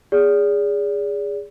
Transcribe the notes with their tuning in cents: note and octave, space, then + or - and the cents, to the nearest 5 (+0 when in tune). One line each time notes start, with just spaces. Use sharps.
G#4 -20 D5 -30